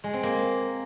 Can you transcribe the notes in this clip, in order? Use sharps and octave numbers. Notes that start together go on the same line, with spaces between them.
G#3
C4
A#3